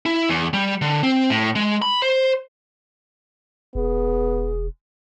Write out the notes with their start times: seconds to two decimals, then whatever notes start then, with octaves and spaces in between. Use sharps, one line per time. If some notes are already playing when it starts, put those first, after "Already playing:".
0.06 E4
0.29 E2
0.53 G3
0.82 D3
1.03 C4
1.30 A2
1.56 G#3
1.82 B5
2.02 C5
3.75 E1 B3 G#4